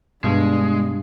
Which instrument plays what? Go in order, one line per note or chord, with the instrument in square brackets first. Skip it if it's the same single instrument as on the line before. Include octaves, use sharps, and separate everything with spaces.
[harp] G2 [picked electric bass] B2 [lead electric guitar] G#3 [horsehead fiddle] D4